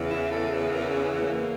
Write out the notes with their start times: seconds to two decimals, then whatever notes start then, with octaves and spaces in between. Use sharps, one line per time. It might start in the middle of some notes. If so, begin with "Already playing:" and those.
Already playing: E2 C#3 E3
0.09 E4
0.32 A4
0.71 A#4
0.89 C#4
1.05 C#4
1.21 A#3